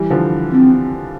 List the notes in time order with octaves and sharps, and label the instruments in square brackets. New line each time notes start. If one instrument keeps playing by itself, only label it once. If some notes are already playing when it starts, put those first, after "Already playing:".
Already playing: [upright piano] E3 G3
D3 F3
[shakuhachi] C4